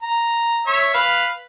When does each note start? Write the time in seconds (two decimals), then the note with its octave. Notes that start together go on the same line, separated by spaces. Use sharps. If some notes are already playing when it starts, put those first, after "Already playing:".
0.03 A#5
0.67 C#5 E5 C#6
0.94 B4 F5